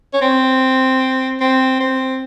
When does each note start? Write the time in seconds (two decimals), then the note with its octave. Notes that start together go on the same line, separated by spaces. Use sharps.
0.13 C#4
0.22 C4
1.40 C4
1.80 C4